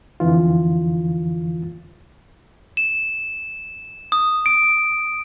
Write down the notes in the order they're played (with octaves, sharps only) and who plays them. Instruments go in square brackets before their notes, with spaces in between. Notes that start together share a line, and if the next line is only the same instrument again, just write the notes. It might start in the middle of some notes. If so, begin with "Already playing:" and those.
[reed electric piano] F2 D3 E3 F4
[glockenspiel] E7
D#6
D7